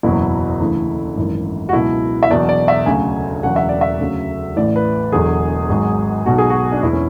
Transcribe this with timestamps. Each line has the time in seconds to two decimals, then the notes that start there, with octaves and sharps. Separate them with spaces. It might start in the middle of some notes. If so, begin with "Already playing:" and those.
0.03 F#1 E2 B2 F#3 E4
0.60 D2 C#3 E3
1.17 G#1 F#2 E3
1.69 F#4
1.73 C#2 B2 F#3 E4
2.23 E5
2.30 E1 E2 B2 F#3 D5
2.49 D5
2.68 E5
2.86 D2 C#3 F#3 G#5
3.43 E1 E2 C#3 F#3 F#5
3.56 E5
3.69 D5
3.81 E5
3.99 D2 C#3 F#3
4.56 A1 A2 E3 D5
4.76 B4
5.12 E1 E2 D3 F#3 G#4
5.69 G#1 G#2 F#3
6.26 B1 B2 F#3 F#4
6.38 G#4
6.50 F#4
6.72 D4
6.83 E1 E2 B2 E4
6.93 C#4